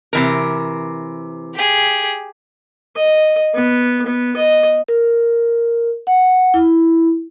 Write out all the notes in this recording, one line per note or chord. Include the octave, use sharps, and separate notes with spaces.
C3 E3 A#4
G4 G#4
D#5
B3
B3
D#5
A#4
F#5
E4